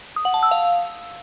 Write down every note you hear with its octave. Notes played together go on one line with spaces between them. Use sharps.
D#6
F#5
A5
E6
F5